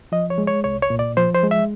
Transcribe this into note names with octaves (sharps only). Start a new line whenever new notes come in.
F3 D#5
C#5
G#3
C#5
C2 C#5
C#5
A#2
D5
F3 C5
C5
G#3
E5